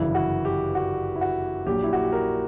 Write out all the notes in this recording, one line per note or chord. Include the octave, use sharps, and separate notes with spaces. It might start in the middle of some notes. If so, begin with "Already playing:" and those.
Already playing: G1 F#2 C#3 E3 E4
F#4
G4
F#4
E4
F#4
A#1 A#2 F#3 G4
E4
F#4
G4
A#4